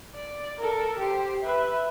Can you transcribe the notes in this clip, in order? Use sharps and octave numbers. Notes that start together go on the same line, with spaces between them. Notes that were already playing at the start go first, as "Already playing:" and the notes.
D5
A4 A#4
G4 C5
B4 E5